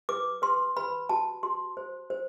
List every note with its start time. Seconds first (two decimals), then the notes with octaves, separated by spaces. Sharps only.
0.09 B4 D6
0.42 B4 C6
0.77 B4 B5
1.09 F#4 A5
1.43 F#4 C6
1.77 C5
2.10 C5